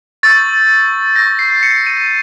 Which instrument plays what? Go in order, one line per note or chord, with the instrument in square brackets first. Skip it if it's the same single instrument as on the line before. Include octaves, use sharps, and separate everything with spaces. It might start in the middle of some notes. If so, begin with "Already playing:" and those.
[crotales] C#6 E6 G6 A6
C#6 E6 G6 A#6
C7
C#7
D#7